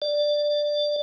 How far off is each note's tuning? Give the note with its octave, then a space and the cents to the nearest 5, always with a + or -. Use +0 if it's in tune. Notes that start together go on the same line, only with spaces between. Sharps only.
D5 +10